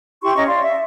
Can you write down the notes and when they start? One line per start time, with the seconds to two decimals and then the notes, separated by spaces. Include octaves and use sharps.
0.23 E4 G4 C6 C#6
0.36 C#4 D#5 A#5 C#6
0.48 D5 F5 C6
0.64 E5